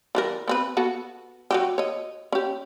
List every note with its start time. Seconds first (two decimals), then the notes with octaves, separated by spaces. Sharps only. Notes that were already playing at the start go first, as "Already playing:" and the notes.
0.15 E3 G3 A#4
0.48 B3 C4 B4
0.77 B3 F#4 A4
1.51 F#3 F#4 G4
1.78 C#5 D#5
2.32 C#4 G4